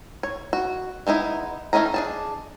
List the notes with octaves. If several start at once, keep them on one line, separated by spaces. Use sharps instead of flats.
C#5
F#4
G#3 B3 D#4 E4
E3 A3 C#4 D#5 A#5
D4 G#4 A5